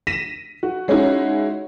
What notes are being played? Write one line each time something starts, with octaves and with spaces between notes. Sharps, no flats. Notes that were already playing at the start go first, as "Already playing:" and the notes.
A#6 B6 D#7 E7
F#4
G#3 C#4 D#4 E4 F#4